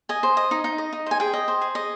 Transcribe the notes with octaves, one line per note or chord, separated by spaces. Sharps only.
D#5 G#5
C5
D#5
D#4
D#4
D#5
D#4
C5 G#5
G#4 G5
D#5
C5
G#4
D#5